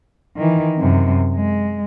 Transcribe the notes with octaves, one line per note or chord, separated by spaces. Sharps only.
D#3 E3
F#2 C3
G#3